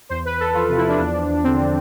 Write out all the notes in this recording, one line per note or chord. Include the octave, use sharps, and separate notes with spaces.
E2 C5
E2 B4
E2 A4
F3 F4
C3
E4
F3 D4
E2
F3
E2
D3 C4